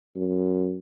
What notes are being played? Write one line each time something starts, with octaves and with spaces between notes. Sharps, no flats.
F#2